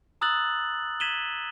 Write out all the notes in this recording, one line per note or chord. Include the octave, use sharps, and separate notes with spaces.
A#5 D#6 E6 F#6 A6 F#7
G#6 B6 D#7 E7 F#7 G7